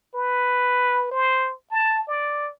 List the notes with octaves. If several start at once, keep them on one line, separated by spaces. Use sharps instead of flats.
B4
C5
A5
D5